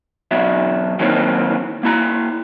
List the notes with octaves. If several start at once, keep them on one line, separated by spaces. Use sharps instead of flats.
B1 E2 B2 F#3 E5
D#3 E3 F#3 A#3 C4 C#4
A#3 E4 A#5